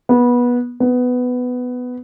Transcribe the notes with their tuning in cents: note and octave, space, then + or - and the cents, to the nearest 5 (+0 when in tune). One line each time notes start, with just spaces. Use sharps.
B3 -20
B3 +10